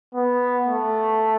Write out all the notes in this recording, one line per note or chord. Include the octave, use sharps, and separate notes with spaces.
B3
A3